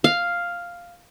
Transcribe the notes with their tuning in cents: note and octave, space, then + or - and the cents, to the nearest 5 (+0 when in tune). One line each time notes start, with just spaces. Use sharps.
F5 +0